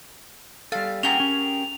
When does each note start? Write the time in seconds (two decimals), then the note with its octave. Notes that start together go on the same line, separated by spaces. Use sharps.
0.72 G3 A4 F5
1.03 C#4 G4 G#4 A#4 F#5 G5 F7
1.20 C#4